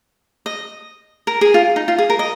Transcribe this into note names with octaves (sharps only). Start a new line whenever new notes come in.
D#5
A#4
G#4
F4
D#4
F4
G#4
A#4
D#5